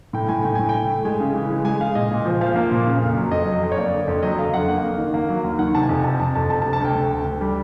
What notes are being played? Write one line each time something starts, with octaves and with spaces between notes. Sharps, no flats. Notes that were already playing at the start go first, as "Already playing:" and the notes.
A2 G5
A2 G#5
A2 G5
A2 G#5
G5
A2
A3
G#3 G#5
C#3
E3
G#3
G#3 G#5
G#3 F5
A#2 D#5
A#2
F3
F3 F5
A#3
A#2
C#3
F2
F#3
F2 D#5
F#3
F2
C#5
A#3 D5
D3
F2
F#3 D#5
D3 F5
F2 F#5
A#3
A#3
D#3
A#3
F#3
D#2
D#3 F#5
C3 A5
G#5
F2
C3 A5
F2 A5
F2 A5
D2 A5
A5
C3
A5
D2 G5
D2
D2
D2
G3